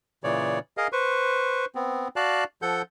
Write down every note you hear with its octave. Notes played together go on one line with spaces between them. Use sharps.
A#2 C#3 E3 C#5 D5
G#4 A#4 D#5 F5
B4 C5 C#6
B3 C4
F#4 D5 F5 A5 F#6
F3 A4 F#5 G6